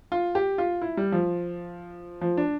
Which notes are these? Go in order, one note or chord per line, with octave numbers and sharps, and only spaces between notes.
F4
G4
F4
E4
G3
F3
F3
D4